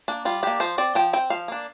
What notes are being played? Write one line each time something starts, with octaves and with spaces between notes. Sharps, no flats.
A#3 D4
G3 F4
A#3 D4 G4
F3 C5
C4 D5
F3 G5
C4 G5
F3 F5
A#3 D4